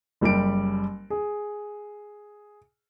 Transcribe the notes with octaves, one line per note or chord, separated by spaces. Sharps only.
F#1 G3 G4 D7
G#4